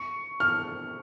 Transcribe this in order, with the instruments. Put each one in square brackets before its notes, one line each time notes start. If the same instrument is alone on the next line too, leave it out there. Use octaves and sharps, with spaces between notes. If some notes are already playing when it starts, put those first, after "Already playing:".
Already playing: [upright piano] C#6
F6